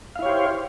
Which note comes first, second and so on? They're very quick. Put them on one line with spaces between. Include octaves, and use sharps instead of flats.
F5 E4 C#5 G4 C5